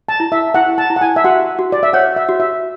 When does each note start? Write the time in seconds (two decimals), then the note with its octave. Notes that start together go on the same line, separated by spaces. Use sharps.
0.09 A5
0.20 E4
0.32 E5
0.54 E4 F#5
0.78 A5
0.90 E4
0.96 F#5
1.01 G#5
1.16 E5
1.24 F#4 F#5
1.59 F#4
1.72 D5
1.83 E5
1.93 C#5 F#5
2.16 E5
2.29 F#4
2.40 E5